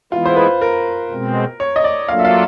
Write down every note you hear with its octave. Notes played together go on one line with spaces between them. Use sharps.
E3 G#3 B3 E4 F4
C5
B4
A#4
B2 G#3 C4
C#5
D#5
D5
F#3 A#3 D4 F4 A4 F5
E5
F5